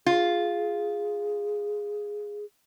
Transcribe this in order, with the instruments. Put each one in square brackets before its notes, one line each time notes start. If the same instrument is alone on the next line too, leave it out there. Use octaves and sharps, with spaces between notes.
[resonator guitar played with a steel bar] F4 [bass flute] G#4